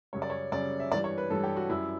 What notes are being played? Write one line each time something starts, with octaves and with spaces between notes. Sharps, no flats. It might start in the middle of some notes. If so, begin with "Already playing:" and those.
F#2 C#3 G3 C#5
D5
C#5
F#2 C#3 G3 D5
E5
G2 E3 G3 D5
C#5
B4
G2 E3 G3 A4
G4
F#4
F#2 E3 G3 E4